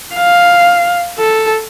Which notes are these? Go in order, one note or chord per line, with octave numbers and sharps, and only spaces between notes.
F5
A4